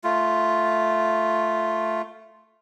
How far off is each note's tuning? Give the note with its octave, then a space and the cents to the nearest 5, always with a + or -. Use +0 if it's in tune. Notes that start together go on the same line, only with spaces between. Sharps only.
A3 +0 F4 +0